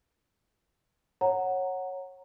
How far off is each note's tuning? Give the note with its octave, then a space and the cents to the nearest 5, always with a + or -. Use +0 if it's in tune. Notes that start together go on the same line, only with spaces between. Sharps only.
C#5 -15 F#5 +0 A#5 -10